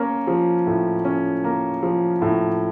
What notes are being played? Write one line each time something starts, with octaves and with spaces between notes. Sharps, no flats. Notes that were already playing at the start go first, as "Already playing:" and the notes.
Already playing: A#3 C#4
F3
A2
C#4
A#3
F3
A2